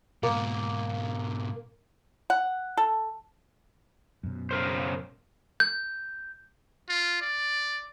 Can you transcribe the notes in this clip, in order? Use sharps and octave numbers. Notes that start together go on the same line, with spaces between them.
G#2 B2 A#3
F#5
A4
F#2 B2
C#3 A#4 C5
G6
F4
D5